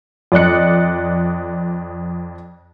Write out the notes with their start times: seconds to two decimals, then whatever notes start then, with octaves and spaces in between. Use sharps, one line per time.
0.32 F2 D5 D#5 F#6 C#7